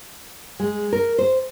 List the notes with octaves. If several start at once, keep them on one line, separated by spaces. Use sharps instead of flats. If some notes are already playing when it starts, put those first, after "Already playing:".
G#3
A#4
C5